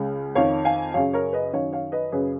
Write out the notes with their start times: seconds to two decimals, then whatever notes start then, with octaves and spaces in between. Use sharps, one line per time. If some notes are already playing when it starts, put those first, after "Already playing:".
Already playing: C#2 C#3
0.35 F2 D#3 C#5 F5
0.65 F5 G#5
0.94 F#2 C#3 C#5 F5
1.13 A#4 C#5
1.33 B4 D#5
1.53 F#2 D#3 C#5 F5
1.73 C#5 F5
1.92 B4 D#5
2.12 F#2 C#3 G#4 B4